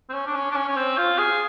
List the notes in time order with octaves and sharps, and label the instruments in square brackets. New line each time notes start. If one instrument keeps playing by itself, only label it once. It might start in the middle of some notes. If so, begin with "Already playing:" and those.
[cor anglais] C4
C#4
D4
C#4
D4
C#4
C#4
C4
F4
G#4